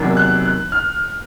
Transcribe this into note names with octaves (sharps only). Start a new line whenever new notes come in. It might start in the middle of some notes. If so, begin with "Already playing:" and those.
Already playing: E2 C3 D#3 F#3 A#3
F#6
F#6
F6